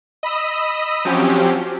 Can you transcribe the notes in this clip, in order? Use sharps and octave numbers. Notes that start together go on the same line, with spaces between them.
D#5 B5 D#6 E6
F3 F#3 C4 C#4 G4